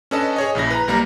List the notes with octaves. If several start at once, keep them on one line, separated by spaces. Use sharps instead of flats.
C#4 D4 A4 B4 D#5 A5
G#4 C#5 D#5
A#1 C#3 E4 A#6
B4 A#5
B1 G3 A#3 A#4 A#5